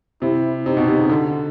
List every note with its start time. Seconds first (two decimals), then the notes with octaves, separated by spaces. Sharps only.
0.22 C3 E4
0.66 C3 D#4
0.77 B2
0.88 C3
0.99 C#3
1.10 D3